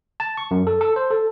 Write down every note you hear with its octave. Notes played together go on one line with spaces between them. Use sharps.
A5
C#6
F#2
A4
A4
C5
A4